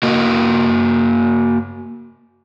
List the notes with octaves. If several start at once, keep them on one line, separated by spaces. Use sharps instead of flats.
A#3 F#4 A#4 D#5